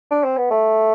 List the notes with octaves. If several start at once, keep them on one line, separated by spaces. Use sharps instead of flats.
D4
C4
B3
A3